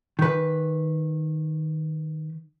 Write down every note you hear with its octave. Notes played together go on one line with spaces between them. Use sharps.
D#3 B4